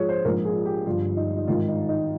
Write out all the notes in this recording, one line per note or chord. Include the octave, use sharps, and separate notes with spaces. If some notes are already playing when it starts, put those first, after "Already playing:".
Already playing: A#1 G#2 F3 G#4 C#5
C5
A#1 G#2 F3 A#4
G#4
G4
G1 G2 F3 F4
D#4
D#4
G#1 G#2 D#3 F4
D#4
D#4